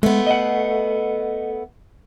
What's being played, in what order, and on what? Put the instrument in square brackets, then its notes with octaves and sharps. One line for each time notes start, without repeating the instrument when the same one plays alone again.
[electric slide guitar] G#3 [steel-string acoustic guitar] A3 B3
[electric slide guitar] D#5 F#5